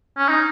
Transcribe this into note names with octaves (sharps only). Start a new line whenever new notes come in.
C#4
D#4